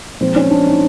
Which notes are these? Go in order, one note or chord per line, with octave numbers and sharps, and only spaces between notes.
A#2 F3 G#3 C4
C#4
D4
D#4